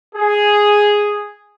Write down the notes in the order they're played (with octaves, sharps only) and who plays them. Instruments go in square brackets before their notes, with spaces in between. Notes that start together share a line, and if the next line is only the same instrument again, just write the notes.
[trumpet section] G#4